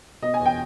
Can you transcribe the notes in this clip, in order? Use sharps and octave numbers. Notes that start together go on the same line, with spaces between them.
B2 D#5
G#5
E2
G5